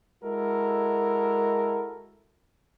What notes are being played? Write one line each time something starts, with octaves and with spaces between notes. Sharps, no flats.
G#3 E4 F#4 A4 A#4